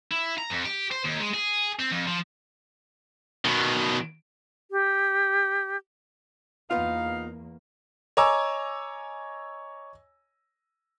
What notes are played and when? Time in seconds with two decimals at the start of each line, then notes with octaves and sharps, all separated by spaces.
0.11 E4
0.38 A#5
0.50 F2
0.65 G4
0.91 C5
1.04 D#2
1.20 G#3
1.34 G#4
1.79 C4
1.92 F2
2.07 F3
3.45 B2 D#3
4.71 G4
6.71 E2 A#3 B3 D#4 F4 F5
8.17 C#5 D#5 G#5 A#5 D6 E6